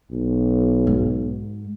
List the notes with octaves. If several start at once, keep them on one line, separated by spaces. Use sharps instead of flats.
B1
G#2